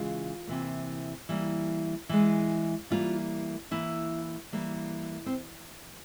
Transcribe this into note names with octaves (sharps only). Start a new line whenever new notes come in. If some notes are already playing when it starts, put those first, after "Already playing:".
Already playing: C#3 E3 G#3 F4
C3 E3 A#3
E3 G3 A#3
E3 G#3
E3 G3 A#3 F4
E3 A#3 E4
E3 G3 A#3
C4